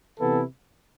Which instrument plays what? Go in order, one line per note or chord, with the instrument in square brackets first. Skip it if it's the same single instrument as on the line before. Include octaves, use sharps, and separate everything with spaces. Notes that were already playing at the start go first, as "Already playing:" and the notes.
[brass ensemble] C3 E3 B3 E4 A4